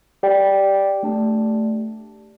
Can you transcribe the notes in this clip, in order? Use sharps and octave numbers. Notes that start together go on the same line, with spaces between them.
G4 D5 G5
A3 D4 G4 D5 A5